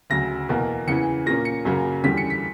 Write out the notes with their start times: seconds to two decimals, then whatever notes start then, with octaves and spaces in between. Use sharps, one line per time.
0.10 D2 C#3 F#3 A#6
0.49 E2 B2 A#3
0.88 E2 C#3 E3 C#7
1.26 A#2 A#3 C#4 A#6
1.45 C#7
1.65 F#2 C#3 F#3 A#3
2.04 E2 D3 G3 C#4 B6
2.17 C#7
2.30 B6